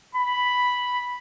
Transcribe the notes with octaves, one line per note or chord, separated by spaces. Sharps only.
B5